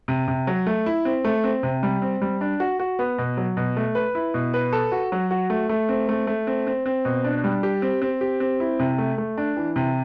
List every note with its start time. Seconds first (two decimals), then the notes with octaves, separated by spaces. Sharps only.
0.08 C3
0.28 C3
0.47 F#3
0.67 A3
0.86 E4
1.05 C4
1.25 A3
1.44 C4
1.63 C3
1.83 G3
2.02 C4
2.22 G3
2.41 D4
2.60 F#4
2.80 F#4
2.99 B3
3.18 B2
3.37 F#3
3.57 B2
3.77 A3
3.95 B4
4.15 E4
4.34 B2
4.54 B4
4.73 A4
4.92 F#4
5.12 F#3
5.31 F#4
5.50 A3
5.69 A3
5.89 C4
6.09 A3
6.27 A3
6.47 C4
6.67 C4
6.86 C4
7.05 B2
7.24 D4
7.44 G3
7.63 G4
7.82 C4
8.02 C4
8.21 G4
8.40 C4
8.60 E4
8.79 C3
8.98 A3
9.18 A3
9.38 D4
9.57 E3
9.76 C3